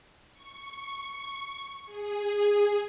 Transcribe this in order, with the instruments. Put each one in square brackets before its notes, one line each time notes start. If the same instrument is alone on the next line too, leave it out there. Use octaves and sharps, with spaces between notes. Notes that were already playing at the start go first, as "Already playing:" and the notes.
[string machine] C#6
G#4